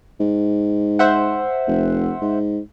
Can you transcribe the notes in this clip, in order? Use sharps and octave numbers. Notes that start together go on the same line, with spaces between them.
G#2
C5 E5 F#5
F1
G#2